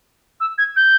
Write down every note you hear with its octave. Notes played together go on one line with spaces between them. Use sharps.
E6
G#6
G6